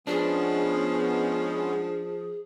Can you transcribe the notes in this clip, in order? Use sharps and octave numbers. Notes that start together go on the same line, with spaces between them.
F3 G#3 B3 C#4 D4 G#4